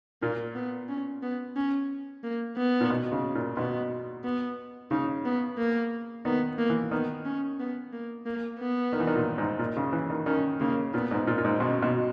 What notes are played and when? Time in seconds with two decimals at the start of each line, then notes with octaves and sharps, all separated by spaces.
0.22 A#2 A#3
0.55 B3
0.89 C#4
1.23 B3
1.56 C#4
2.24 A#3
2.57 B3
2.81 A#2
2.90 B2
3.12 C#3
3.35 A#2
3.57 B2 B3
4.24 B3
4.91 C#3 D#4
5.25 B3
5.58 A#3
6.25 D#3 B3
6.58 A#3
6.70 E3
6.91 D#3 B3
7.25 C#4
7.59 B3
7.93 A#3
8.26 A#3
8.59 B3
8.93 D#3
9.00 E3
9.07 D#3
9.15 A#2
9.38 G#2
9.59 A#2
9.77 C#3
9.93 E3
10.10 D#3
10.26 D#3 C#4
10.60 C#3 A#3
10.94 A#2 B3
11.11 G#2
11.27 A#2
11.38 A#2
11.45 G#2
11.60 B2 C#4
11.82 B2